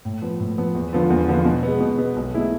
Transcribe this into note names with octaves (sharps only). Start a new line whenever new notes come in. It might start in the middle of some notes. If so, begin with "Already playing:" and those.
A2
F3 B3
A2
F3 B3
E2
D3 F3 B3 F4
E2
D3 F3 B3 F4
B2
G#3 B3
B2
G#3 B3
B1
B2 A3 E4 G#4